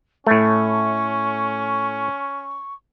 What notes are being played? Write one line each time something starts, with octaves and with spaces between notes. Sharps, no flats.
A2 A3 C#4 C#6